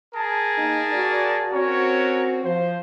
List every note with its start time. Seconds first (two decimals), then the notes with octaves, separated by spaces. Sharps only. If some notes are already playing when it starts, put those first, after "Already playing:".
0.15 G#4 A#4 A5
0.58 A#3 D#4
0.93 A#2 F#4 D5
1.52 C4 C#4 F#4 A#4 C#5
2.44 F3 C5